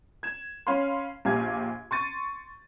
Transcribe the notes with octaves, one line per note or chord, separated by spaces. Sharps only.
G#6 E7
C#4 F5 B5 C6
A#1 G4 F5 G#5 G#6
C6 C#6 A6 D#7